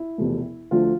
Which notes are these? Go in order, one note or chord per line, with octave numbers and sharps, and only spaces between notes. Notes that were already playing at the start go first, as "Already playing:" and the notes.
Already playing: E4
E1 E2 C3 F3 A3
D2 D3 F3 A3 F4